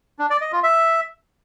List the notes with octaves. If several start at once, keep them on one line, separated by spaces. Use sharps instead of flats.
D4
D5
D#5
F4
E5